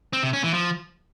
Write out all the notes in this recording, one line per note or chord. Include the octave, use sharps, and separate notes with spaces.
C4
C3
C#4
E3
F3